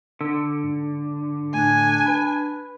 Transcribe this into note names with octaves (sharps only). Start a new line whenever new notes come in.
D3 E6
G#2
A2 A3 D4 G#5
B4 B5